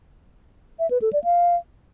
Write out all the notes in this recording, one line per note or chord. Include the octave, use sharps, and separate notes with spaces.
E5
B4
A4
D5
F5